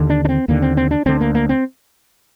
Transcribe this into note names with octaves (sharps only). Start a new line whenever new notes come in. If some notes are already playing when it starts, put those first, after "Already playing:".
Already playing: D#2 D3
D4
D4
C4
D#2 D3 A#3
C4
C4
D4
D2 D3 C4
A#3
A#3
C4